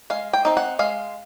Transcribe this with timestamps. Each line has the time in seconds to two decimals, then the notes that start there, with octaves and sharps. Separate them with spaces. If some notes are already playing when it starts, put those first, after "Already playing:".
0.10 G#3 F5
0.33 G5
0.45 C4 D#4
0.57 F#5
0.79 G#3 F5